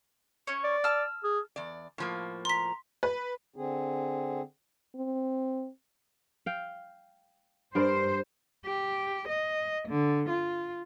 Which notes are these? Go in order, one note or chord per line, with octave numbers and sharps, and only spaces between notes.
C#4 C#5
D5
A5 E6 F6
G#4
E2 D5
A2 F3 A#3
A#5 C6 B6
B4
D3 C4 G#4
C4
F5 G5
G2 A#4 C5 D5
G4
D#5
D3
F4